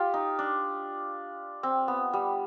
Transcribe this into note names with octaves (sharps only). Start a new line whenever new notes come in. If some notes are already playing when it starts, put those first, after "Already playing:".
Already playing: F4 G4
D#4
D4
C4
B3
G3